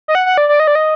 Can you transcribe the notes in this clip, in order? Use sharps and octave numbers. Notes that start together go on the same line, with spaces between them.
D#5
F#5
F#5
D5
D5
D#5
D5
D#5